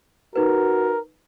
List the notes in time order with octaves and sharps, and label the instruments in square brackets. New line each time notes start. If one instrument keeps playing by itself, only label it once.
[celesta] D#4 B4 [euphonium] F#4 [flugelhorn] A#4